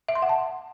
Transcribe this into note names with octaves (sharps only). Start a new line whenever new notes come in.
E5
C6
F#5
A5